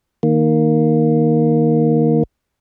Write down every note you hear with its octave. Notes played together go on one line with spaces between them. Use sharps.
D#3 A#3